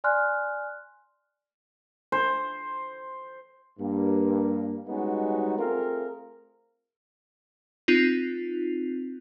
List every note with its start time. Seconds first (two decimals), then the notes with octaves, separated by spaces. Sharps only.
0.04 D5 G#5 C6 F6 F#6
2.12 C5
3.79 G2 A#3
4.87 G3 G#3 B3 C#4 D#4 F#4
5.58 A3 C4 F4 G#4 A#4
7.88 C4 D#4 F4